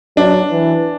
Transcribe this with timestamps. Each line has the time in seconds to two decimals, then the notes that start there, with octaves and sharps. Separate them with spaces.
0.17 F#3 D4
0.51 E3